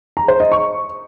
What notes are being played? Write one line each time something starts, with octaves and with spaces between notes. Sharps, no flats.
A#5
C5
D#5
C#6